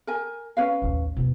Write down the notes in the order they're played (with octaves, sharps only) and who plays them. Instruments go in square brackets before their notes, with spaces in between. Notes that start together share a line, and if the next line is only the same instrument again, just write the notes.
[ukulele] A#4 G#5
C#4 B4 F5
[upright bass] A1 D#2
D#2 B2